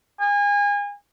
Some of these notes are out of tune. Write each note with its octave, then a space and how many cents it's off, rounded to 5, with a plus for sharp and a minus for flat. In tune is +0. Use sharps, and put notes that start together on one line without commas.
G#5 -30